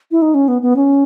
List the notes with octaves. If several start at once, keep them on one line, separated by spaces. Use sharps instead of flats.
E4
D#4
C#4
B3
B3
C#4